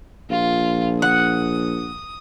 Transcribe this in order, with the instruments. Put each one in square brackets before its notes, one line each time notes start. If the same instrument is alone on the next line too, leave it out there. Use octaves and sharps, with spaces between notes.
[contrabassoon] A#1 [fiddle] F4
[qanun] F#5 [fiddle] D#6